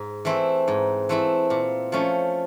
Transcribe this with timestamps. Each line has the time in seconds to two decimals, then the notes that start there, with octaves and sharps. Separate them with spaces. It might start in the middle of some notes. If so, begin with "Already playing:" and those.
Already playing: G#2
0.25 E3 A3 C4 E4
0.68 G#2
1.09 E3 A3 C4 E4
1.50 A#2
1.92 F3 A3 C#4